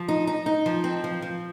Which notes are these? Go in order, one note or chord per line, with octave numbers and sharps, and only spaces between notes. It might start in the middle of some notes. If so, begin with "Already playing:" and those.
Already playing: F3
D#4
D#4
D#4
F3
C4
F3
F3